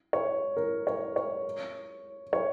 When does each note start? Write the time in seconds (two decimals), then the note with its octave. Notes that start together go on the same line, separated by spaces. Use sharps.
0.13 C#5
0.56 A#4
0.87 C#5
1.16 C#5
2.33 C#5